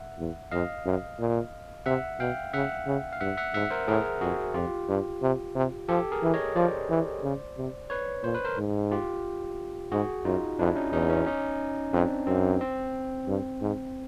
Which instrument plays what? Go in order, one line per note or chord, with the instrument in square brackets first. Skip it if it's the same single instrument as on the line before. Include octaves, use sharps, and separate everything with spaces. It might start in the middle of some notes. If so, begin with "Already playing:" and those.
Already playing: [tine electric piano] E5 F#5
[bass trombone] E2
[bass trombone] F2 [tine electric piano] D#5 F5
[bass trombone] F#2
A#2
[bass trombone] C3 [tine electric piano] E5 F#5
[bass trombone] B2 [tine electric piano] F5 G5
[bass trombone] C#3 [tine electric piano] E5 F#5
[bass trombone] C#3
[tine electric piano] F5
[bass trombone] G2 [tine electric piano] E5 F#5
[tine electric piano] E5 F#5
[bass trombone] G#2 [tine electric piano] E5 F#5
[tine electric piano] A#4 C5
[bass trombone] A2 [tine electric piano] G#4 A#4
[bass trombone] F2 [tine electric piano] F#4 G#4
[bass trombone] F2 [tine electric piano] F4 G4
[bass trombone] G2
C3
C3
[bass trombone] F3 [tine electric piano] G4 A4
[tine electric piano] G#4 A#4
[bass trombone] E3
[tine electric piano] C#5 D#5
[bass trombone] F3 [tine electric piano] C5 D5
[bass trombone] E3
C#3
C3
[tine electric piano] B4 C#5
[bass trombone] A#2 [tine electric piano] C5
[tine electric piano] B4
A#4 C5
[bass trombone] G#2
[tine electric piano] F4 G4
[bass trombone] G#2 [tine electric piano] F#4 G#4
[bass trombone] F#2 [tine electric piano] D#4 F4
[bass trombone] F2 [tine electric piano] D4 E4
[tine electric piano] C#4 D#4
[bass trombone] E2 [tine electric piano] C#4 D#4
[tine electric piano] B3 C#4
C#4 D#4
[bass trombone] F2 [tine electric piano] C4 D4
[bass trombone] F#2 [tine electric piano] C4
[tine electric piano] C4
[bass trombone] G2
G#2